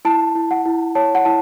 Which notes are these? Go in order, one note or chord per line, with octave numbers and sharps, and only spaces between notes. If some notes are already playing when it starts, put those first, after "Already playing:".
E4 A5
E4
F#5
E4
C#5 A5
F#5
E4 A5